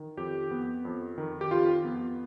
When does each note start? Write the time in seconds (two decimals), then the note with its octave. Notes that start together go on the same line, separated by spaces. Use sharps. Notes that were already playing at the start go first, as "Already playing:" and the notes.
Already playing: D#3
0.17 F2 G4
0.51 B3
0.85 F2
1.18 D#3
1.41 G4
1.51 F2 F4
1.85 B3